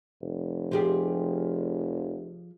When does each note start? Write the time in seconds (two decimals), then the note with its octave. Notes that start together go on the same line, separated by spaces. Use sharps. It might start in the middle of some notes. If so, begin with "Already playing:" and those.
0.21 F1
0.72 F3 G4 G#4